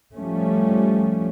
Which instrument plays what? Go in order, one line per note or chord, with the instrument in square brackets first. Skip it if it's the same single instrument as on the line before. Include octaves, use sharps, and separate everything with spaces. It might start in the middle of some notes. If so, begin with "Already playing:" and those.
[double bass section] F3 G3 A3 C#4